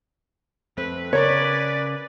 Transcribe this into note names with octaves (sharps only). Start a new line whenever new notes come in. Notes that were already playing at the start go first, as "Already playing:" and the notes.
F2 A3 C4 B4
C#3 C#4 A#4 B4 C#5 D5